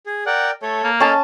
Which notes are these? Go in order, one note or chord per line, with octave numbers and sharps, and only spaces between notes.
G#4
A#4 D5 F#5 G5
A3 A4 C#5
A#3
C#4 A4 D#5 F5 A5